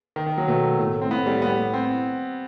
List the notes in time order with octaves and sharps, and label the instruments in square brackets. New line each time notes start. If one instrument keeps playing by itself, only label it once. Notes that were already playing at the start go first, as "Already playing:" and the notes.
[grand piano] D#3
D#3
F#3
[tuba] B2 [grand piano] A3
[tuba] A2
[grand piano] C4
[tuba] A2 [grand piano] B3
[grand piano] G3
B3
C4